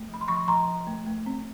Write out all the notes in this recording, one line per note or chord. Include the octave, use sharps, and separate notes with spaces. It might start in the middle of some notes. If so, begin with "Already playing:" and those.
Already playing: A3
F3
B5
C6
F3 B5 C#6
F3 A#5 C6
F3
A3
A3
C4